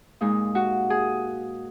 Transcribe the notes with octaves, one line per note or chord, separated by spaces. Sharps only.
A#2 G#3 D#4
F#4
G#4